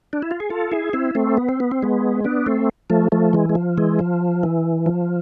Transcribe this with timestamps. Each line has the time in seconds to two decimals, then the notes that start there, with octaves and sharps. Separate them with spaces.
0.13 D4
0.22 E4
0.31 F4
0.40 G#4
0.50 F4 A4
0.72 E4 G#4
0.93 C4 E4
1.15 A3 C4
1.37 B3
1.49 C4
1.60 B3
1.71 C4
1.82 G#3 B3
2.24 B3 D4
2.46 A3 C4
2.90 F3 A3
3.12 F3 A3
3.33 E3 G#3
3.49 G#3
3.55 F3
3.77 E3 G#3
3.99 F3
4.43 E3
4.86 F3